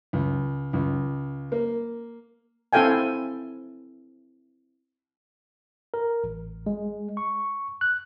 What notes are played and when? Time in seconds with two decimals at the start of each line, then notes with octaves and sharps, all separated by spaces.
0.13 C#2
0.73 C#2
1.52 A#3
2.73 C4 E4 A4 F5 G5 G#5
5.94 A#4
6.24 A1
6.67 G#3
7.17 C#6
7.81 F#6